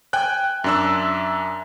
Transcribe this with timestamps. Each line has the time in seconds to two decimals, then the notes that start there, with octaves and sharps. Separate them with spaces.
0.13 G5 G#5 F#6
0.64 F#2 D4 E5 E6